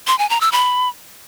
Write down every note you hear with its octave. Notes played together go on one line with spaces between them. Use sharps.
C6
G#5
A#5
E6
B5